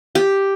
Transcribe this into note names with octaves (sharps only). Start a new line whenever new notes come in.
G4